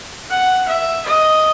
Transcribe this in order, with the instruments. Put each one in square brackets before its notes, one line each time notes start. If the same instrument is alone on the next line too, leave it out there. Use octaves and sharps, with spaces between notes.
[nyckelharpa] F#5
E5
D#5